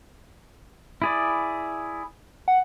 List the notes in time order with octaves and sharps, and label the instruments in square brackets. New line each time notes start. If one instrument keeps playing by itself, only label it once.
[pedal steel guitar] E4 G#4 D5
[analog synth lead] F#5